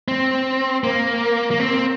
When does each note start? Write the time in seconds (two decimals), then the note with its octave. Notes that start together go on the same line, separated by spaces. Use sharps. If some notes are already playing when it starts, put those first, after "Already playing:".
0.08 C4
0.84 A#3
1.51 A#3
1.60 C4